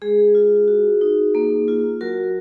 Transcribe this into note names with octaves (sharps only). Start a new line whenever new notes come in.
G#3 G#4
F4
F#4
D#4
A#3
F4
F#3 F#4 A#4